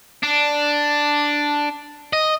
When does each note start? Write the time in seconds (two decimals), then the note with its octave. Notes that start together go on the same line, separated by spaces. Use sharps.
0.23 D4
2.13 D#5